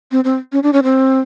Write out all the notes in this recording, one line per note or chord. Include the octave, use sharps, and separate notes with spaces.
C4
C4
C#4
D4
C#4
C4